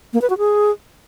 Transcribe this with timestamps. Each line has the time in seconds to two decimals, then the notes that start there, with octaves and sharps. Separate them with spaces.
0.13 A#3
0.22 B4
0.30 F#4
0.38 G#4